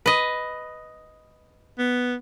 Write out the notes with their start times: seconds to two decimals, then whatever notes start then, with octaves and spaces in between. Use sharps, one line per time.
0.06 B4 D#5
1.79 B3